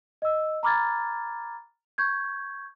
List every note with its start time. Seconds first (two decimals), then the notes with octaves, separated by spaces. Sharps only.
0.22 D#5 E6
0.63 A#5 B5 D6 F6 G#6 A6
1.98 C#6 G6 G#6